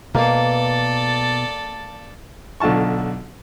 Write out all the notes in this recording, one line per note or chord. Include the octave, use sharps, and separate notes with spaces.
B2 A#3 A4 D5
B1 D3 F4 A5 C#6